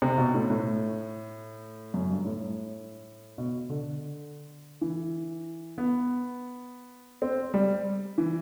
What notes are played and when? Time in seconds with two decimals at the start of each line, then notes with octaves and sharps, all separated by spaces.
0.02 C3
0.18 B2
0.34 A2
0.50 A2
1.94 F#2
2.10 G2
2.25 A2
3.38 B2
3.69 D3
4.81 E3
5.78 B3
7.22 C4
7.54 G3
8.18 E3